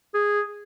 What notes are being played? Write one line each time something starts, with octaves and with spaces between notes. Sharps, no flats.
G#4